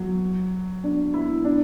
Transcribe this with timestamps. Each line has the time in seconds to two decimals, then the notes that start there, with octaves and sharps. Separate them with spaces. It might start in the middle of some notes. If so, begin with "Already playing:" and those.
Already playing: F#3
0.84 D4
1.14 E4
1.45 D4